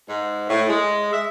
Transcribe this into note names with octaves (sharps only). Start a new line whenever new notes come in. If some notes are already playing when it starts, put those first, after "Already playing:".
G#2
A2
G#3
E5